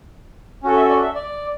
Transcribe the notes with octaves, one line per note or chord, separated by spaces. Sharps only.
C#4 F#4 A4
E5
D5
E5
D5